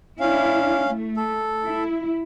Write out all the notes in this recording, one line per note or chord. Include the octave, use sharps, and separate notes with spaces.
C#4 D4 E4 F5
A3
A4
E4